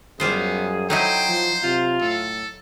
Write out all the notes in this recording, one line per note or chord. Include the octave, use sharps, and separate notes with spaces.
F#2 G3 B3 F4 G#4 C5
F#3 D#4 E4 A4 C5 G5
F3
C3 F4
A2 A4